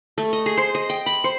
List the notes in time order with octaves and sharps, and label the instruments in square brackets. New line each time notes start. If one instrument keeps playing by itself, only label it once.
[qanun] A3
D#5
G#4
C5
D#5
G5
B5
C5